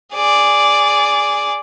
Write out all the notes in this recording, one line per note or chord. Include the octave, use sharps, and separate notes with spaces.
G#4 D5